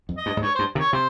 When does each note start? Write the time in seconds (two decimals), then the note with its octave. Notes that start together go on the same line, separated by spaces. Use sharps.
0.09 F2
0.17 D#5
0.26 G2
0.37 G#2
0.42 G2 C#5
0.55 C5
0.59 G2
0.75 C3 D#3
0.80 C#5
0.93 C3 C5